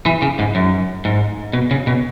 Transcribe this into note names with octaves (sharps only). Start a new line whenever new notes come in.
E3
C#3
G#2
F#2
G#2
B2
C#3
B2